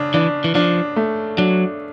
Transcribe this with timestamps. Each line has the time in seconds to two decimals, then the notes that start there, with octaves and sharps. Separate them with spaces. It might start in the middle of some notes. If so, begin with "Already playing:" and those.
Already playing: C#3 D4
0.14 E3 D4
0.44 E3
0.55 F3 D4
0.96 A3
1.38 F#3 D4